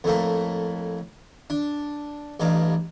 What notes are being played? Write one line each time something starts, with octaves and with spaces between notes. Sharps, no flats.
F2 A2 A3 A#3
D4
A1 G2 D#4 D5 F5